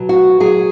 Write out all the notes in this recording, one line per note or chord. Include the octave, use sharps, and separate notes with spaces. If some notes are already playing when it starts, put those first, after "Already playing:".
Already playing: B2 F#3
F#4
F#3 G#4